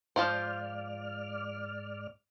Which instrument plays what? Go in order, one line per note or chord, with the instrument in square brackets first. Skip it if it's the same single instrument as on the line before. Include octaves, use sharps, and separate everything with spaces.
[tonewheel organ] G#2 D5 F6 [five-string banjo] F3 F4 C5